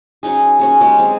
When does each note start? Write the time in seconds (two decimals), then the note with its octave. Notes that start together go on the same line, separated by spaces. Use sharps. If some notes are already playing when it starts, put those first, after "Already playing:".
0.23 F#3 C#4 D#4 G#4
0.60 C#4 F#4 G#4
0.81 F#3 G#3 C#4 G4
0.98 C4 G#4